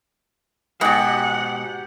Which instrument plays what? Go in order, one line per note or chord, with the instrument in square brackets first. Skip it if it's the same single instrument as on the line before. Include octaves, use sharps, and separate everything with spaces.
[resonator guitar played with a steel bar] G#2 B2 [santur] G4 [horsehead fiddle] F#5